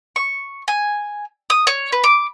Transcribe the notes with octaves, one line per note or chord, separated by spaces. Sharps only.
C#6
G#5
D#6
C#5
B4
D6